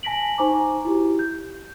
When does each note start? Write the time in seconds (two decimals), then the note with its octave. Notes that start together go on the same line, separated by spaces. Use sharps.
0.03 G#5 A5 A#6 B6 D7 F#7
0.38 D#4 C5 G#5 A#5 C#6 D6
0.85 E4 F#4 G4
1.19 G6